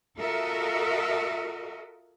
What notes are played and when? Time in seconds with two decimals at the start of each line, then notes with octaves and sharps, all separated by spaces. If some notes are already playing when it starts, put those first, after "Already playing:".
0.18 F4 F#4 A4 A#4 D#5 E5